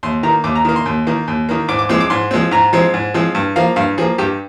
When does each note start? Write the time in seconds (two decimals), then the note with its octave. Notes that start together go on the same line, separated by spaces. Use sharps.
0.03 D#2 C6
0.23 D#3 A#5
0.28 A#3
0.44 D#2 D6
0.55 A#5
0.65 D#3 A#3
0.76 C6
0.86 D#2
1.07 D#3 A#3
1.28 D#2
1.49 D#3 A#3
1.68 G#2 D6
1.79 D6
1.89 F3 G#3 C4 D6
2.00 D6
2.10 G#2 C6
2.31 F3 G#3 C4
2.51 G#2 A#5
2.73 F3 G#3 C4
2.94 G#2
3.14 F3 G#3 C4
3.35 G2
3.56 F3 A#3 F5
3.76 G2 F5
3.98 F3 A#3 G#4
4.18 G2 G4